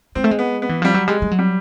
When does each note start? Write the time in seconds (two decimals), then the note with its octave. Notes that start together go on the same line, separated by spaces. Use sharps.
0.15 G#3 C4
0.24 A3
0.31 G#3
0.39 B3
0.62 B3
0.69 E3
0.82 F3 G3
0.94 F#3
1.08 G3 G#3
1.22 G3
1.31 F#3
1.39 G3